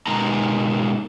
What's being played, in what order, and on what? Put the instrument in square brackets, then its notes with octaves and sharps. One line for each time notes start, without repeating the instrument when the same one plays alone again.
[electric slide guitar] B2 G#3 A#3 D#4 A#5